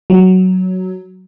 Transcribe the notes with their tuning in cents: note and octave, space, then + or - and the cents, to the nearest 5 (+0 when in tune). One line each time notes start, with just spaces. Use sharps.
F#3 +5